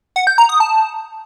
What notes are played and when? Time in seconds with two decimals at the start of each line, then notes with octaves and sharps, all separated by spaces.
0.16 F#5
0.27 G6
0.38 A#5
0.49 D#6
0.60 A5